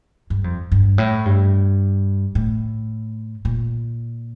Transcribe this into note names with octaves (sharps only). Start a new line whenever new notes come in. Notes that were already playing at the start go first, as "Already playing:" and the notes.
G2
F2
G2
A2
G2
A2
A#2